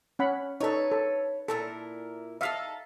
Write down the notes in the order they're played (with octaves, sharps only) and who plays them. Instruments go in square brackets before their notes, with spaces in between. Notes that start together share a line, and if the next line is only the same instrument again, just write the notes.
[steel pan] C#4 F#5 B5
[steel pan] D#4 A4 [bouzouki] B4 C#5
[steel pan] A4
[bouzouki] A#2 E4 A#4 [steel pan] A4
[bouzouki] D#4 F4 A4 [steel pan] E5 F5